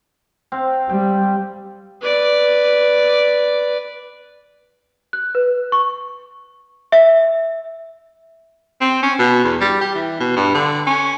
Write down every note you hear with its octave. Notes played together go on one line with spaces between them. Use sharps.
C4 F5 G5
G3 G5
B4 D5
F#6
B4
C#6
E5
C4
C#4
B2
E2
G3
G4
E3
B2
G2
D3
C#4